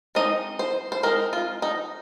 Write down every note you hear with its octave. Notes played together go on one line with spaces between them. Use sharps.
G#3 C4 D#4 D#5
C5
C5
G#3 C4 D#4 A#4
F4
D#4